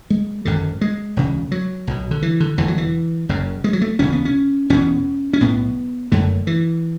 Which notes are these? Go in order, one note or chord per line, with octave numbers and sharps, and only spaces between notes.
G#3
G#1 F#2 D3
G#3
E1 D2 C#3
F#3
B1 B2
D3
E3
D3
E1 E2 D3 E3
F#3
E3
F#1 F#2 C#3
G#3
F#3
A3
E1 D2 C#3 C#4
B3
C#4
E1 E2 B2 C#4
C#4
B1 A2 B3
F#1 F#2 D3 A3
E3